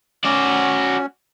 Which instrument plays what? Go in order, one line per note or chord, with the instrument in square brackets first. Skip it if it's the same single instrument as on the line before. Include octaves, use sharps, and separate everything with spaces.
[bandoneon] C#4 [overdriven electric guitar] F#4 D5